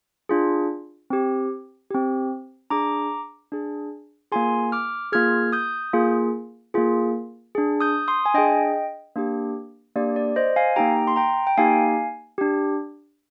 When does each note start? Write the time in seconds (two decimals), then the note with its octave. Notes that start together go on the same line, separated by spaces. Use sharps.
0.29 D4 F4 G#4
1.10 C4 G4
1.91 C4 G4
2.70 D4 G#4 A#5 D6
3.52 D4 G#4
4.32 A#3 F4 G#4 G#5 C6
4.72 D6 F6
5.12 A#3 F4 G#4 F6 G#6
5.53 D#6 G6
5.93 A#3 F4 G#4
6.74 A#3 F4 G#4
7.55 D4 G#4
7.81 D#6 G6
8.08 C6 D#6
8.26 G#5
8.34 D4 G#4 D#5 G5
9.16 A#3 D4 G4
9.96 A#3 D4 G4 D5
10.16 D5
10.36 C5 D#5
10.56 F5 G#5
10.76 A#3 D#4 G4 G5 A#5
11.07 C6
11.16 G5 A#5
11.47 G5
11.57 A#3 D#4 G4 F5 G#5
12.38 D4 G4